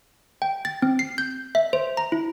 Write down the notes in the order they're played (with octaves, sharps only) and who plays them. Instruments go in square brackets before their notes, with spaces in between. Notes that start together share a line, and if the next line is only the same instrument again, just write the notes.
[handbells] G5
A6
C4
C7
G6
E5
C5
A#5
E4